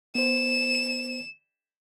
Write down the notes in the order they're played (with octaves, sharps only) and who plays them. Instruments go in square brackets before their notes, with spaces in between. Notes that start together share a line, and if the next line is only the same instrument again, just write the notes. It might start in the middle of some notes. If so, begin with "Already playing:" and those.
[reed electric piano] B3 C5 [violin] E7